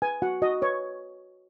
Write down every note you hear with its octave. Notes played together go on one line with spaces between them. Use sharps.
B4 G#5
F#4 F#5
F#4 D#5
B4 C#5